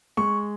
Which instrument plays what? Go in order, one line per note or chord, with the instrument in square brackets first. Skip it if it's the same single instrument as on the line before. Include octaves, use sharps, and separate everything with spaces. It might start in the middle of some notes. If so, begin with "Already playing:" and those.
[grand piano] G#3 C#6